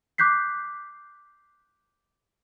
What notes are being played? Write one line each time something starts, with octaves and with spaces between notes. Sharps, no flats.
D6 F#6 G6 B6 C7